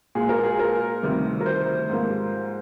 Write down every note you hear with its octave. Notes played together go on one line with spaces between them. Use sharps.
A#2 G#3 G#4
A#4
G#4
A#4
D2 C3 D#3 G3
A#4
C5
G#2 F3 A#3